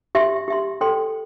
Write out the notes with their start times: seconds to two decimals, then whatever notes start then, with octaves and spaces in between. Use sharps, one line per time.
0.15 G4 E5 C6
0.48 G4 E5 C6
0.81 A4 C5 G5 C6